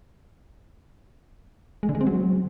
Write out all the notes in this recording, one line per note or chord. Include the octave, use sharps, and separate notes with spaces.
G#3
D3
G#3
C4
F#3